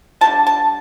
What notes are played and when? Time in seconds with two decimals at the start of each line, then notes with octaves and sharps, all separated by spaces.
0.21 D3 G3 D4 A5
0.47 A5